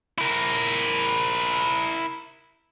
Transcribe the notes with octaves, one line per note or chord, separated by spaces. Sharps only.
E4 A#4